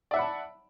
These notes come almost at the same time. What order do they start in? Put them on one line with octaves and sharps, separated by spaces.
D5 E5 F#5 B5 A5